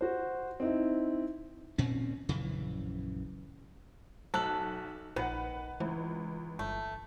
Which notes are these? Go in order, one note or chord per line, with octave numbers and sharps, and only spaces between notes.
F#4 C5
C4 D#4 E4
A#2 C4 C#4
A#1 F#2 C#3 E3
B1 A4 F#6 F#7
A#1 D#3 B4 F#5
C#2 E3
G1 A3